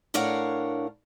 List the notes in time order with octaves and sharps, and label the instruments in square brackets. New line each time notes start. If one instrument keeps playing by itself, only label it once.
[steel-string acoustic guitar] A2 D4 A#4 C#5 F5 F#5